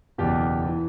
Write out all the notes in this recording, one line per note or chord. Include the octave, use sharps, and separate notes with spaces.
F#1 E2 B2 G4
E3